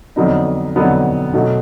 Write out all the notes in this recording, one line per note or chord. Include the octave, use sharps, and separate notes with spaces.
F2 D3 F#3 B3 D#4
F2 D3 F#3 B3 D#4
B2 F#3 A3